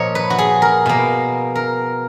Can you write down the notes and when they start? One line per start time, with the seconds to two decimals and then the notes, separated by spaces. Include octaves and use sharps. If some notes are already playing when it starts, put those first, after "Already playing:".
Already playing: A#2 F3 A#3 C#5 D#5
0.15 B4
0.30 F#4
0.39 G#4
0.62 A#4
0.86 B2 A#3
1.56 A#4